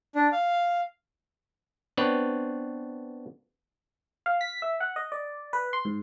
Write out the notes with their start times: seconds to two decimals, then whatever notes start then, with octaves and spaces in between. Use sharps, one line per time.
0.15 D4
0.32 F5
1.97 B3 C4 D4 B4 C#5
4.26 F5
4.41 B6
4.62 E5
4.80 F#5
4.96 D#5
5.12 D5
5.53 B4
5.73 C6
5.85 G#2